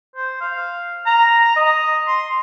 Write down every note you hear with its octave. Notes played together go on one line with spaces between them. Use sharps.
C5
F5
A#5
D#5
C6